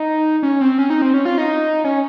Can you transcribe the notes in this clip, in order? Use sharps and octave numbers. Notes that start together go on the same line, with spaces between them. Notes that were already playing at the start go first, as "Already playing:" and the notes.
Already playing: D#4
C#4
C4
C#4
D#4
C4
C#4
F4
D#4
C#4